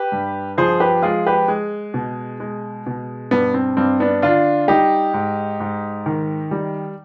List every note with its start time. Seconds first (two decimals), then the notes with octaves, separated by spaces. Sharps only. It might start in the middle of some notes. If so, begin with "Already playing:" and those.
Already playing: G4 B4
0.12 G2
0.58 F3 G#4 C5
0.80 G4 B4
1.03 G#3 F4 G#4
1.26 G4 B4
1.48 G#3
1.94 B2
2.40 G#3
2.86 B2
3.31 G2 B3
3.54 C4
3.77 G2 C4
4.00 B3 D4
4.22 D3 D4 F4
4.68 G3 D#4 G4
5.14 G#2
5.60 G#2
6.06 D#3
6.51 G3